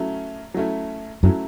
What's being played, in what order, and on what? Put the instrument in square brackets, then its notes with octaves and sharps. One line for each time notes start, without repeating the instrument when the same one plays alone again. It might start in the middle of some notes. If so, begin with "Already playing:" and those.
Already playing: [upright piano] F#3 A3 C#4 E4
F#3 A3 C#4 E4
[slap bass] F#2 [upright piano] F#3 A3 C#4 E4